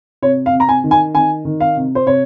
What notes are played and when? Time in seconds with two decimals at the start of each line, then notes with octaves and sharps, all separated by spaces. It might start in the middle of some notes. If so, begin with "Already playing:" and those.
0.22 C3 C#5
0.46 F5
0.53 C3
0.60 A#5
0.69 G#5
0.84 D#3
0.91 G#5
1.15 D#3 G#5
1.45 D#3
1.60 F5
1.77 C3
1.95 C5
2.06 C3 C#5